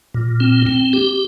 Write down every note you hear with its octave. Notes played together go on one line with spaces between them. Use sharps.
A#2
C4
C4
G4